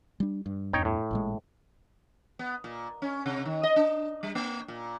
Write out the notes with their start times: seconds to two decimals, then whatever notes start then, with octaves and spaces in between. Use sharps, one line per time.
0.20 G3 D4
0.46 G2
0.73 E2 G2 D#4 C#5 G5
0.85 A2
1.11 A1 A#2 G#3
2.39 B3
2.64 A#2
3.02 C#4
3.26 C3
3.45 D#3
3.63 D#5
3.76 D4
4.23 G3
4.35 A#3
4.68 A#2